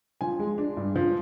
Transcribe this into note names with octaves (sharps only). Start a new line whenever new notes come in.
F3 G#5
G#3
D4
G2
F3